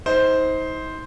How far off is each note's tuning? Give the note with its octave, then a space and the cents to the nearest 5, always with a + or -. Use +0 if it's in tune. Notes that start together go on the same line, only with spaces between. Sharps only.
D#4 +35 C5 +0